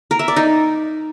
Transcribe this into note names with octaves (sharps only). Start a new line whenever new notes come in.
A#4
E5
D5
D#4